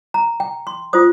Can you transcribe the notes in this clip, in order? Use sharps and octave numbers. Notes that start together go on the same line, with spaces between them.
A#5
G5
C6
F4 C5 D#6